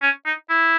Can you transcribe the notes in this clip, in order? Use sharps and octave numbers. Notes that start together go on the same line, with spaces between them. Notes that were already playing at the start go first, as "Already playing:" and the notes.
C#4
D#4
E4